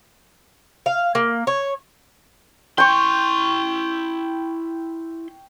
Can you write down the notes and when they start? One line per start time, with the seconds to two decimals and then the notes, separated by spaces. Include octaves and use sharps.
0.86 F5
1.15 A#3
1.47 C#5
2.78 E4 G5 C6 C#6